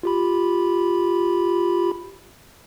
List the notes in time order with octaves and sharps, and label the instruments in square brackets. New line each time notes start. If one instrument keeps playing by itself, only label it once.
[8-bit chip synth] F4 G4 B5